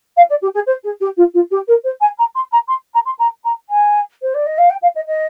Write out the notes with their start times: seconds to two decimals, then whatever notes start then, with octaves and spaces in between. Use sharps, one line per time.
0.16 F5
0.29 D5
0.41 G4
0.54 G#4
0.66 C5
0.83 G#4
1.00 G4
1.17 F4
1.34 F4
1.51 G4
1.67 A#4
1.84 C5
2.01 G#5
2.18 A#5
2.35 C6
2.51 A#5
2.68 C6
2.94 A#5
3.05 C6
3.18 A#5
3.44 A#5
3.69 G#5
4.22 C5
4.34 D5
4.46 D#5
4.58 F5
4.70 G5
4.82 F5
4.95 D#5
5.07 D#5